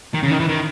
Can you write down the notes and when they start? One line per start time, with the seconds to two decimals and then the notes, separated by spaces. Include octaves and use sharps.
0.14 D#3
0.23 C#3
0.31 D#3
0.40 E3
0.49 D#3